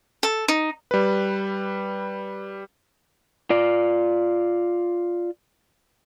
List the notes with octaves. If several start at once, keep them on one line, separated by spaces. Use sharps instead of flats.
A4
D#4
G3 B4
F4 D5